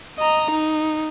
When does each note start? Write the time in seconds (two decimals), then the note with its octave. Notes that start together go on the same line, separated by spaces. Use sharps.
0.18 D#5 A#5
0.52 D#4